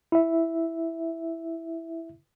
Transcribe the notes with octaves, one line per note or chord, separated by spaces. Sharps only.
E4 E5